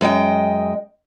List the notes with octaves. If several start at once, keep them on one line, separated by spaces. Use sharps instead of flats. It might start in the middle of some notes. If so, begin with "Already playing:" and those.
F#2 G#3 D#5 G5